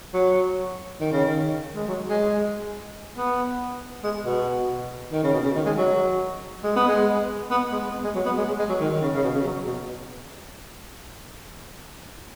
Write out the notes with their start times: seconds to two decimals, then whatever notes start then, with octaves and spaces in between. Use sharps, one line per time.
0.14 F#3
1.00 D#3
1.12 C#3
1.24 D#3
1.75 G#3
1.87 F#3
2.09 G#3
3.17 B3
4.03 G#3
4.25 B2
5.12 D#3
5.23 C#3
5.33 B2
5.44 C#3
5.55 D#3
5.66 G#3
5.77 F#3
6.64 G#3
6.76 B3
6.88 G#3
7.51 B3
7.72 G#3
7.94 B3
8.04 G#3
8.15 F#3
8.26 B3
8.37 G#3
8.48 G#3
8.59 G#3
8.69 F#3
8.80 D#3
8.92 D#3
9.01 C#3
9.14 C#3
9.24 B2
9.34 C#3
9.45 F#3
9.67 B2